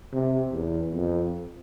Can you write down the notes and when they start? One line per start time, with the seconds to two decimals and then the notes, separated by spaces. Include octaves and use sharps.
0.13 C3
0.52 E2
0.93 F2